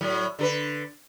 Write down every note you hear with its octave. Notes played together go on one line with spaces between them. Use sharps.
A2 F#3
D3 A4 B4